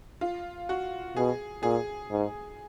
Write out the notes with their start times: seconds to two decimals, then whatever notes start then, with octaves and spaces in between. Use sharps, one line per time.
0.21 F4
0.69 F#4
1.16 B2 G#4
1.63 A#2 G#4
2.10 G#2